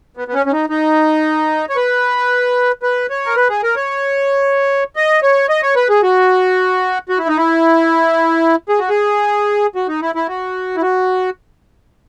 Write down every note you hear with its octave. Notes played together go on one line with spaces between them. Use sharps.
B3
B3
C#4
C#4
D#4
D#4
C#5
B4
B4
C#5
A#4
B4
G#4
A#4
C#5
D#5
C#5
D#5
C#5
B4
G#4
F#4
F#4
E4
D#4
E4
G#4
F#4
G#4
F#4
D#4
E4
E4
F#4
E4
F#4